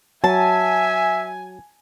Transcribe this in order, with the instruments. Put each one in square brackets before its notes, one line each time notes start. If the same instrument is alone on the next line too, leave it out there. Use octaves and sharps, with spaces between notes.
[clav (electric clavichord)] F#3 [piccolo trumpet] E5 [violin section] G#5 [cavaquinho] A5